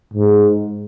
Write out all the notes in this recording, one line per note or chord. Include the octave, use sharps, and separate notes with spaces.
G#2